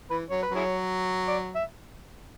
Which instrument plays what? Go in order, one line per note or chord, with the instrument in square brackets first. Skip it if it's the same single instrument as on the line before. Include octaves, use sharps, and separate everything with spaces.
[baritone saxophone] E3 [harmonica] B4
[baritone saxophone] F#3 [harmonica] C#5
[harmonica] B4
[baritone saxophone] F#3
[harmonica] E4 G#4 C#5
D5
E5